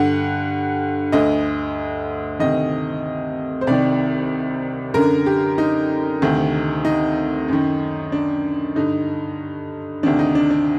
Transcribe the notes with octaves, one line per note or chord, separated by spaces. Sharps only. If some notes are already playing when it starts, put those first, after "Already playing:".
Already playing: G2 D3 F#5
D2 D3 D#5
D2 C3 D#3 D#5
C5
C2 C3 D#3 D5
F#2 D3 A#4
G4
D#4
D2 C3 D#3
D#4
F#2 D#3
D4
G2 D3 D#4
D2 C3 D#3 D4
D#4
D4
D4